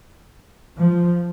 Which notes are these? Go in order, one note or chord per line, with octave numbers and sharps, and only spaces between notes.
F3